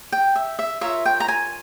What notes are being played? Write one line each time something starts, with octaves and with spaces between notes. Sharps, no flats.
G5
E5
E5
F4 A#4 C#5 E5
G5
A#5
G#5